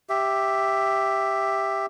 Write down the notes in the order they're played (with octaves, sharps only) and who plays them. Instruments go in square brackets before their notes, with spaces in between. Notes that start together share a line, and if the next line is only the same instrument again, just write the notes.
[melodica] G4 E5